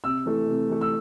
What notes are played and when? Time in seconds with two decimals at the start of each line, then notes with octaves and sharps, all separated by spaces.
0.04 C3 E6
0.26 E3 A3
0.48 C3
0.69 E3 A3
0.81 E6